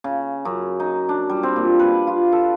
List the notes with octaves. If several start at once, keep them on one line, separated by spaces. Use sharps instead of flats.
C#3
F#2
D#4
D4
G3
C4
A#2
B4
F4
A4